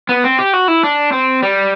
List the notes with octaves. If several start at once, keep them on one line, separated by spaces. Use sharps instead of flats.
B3
C4
G4
F#4
E4
D4
C4
G3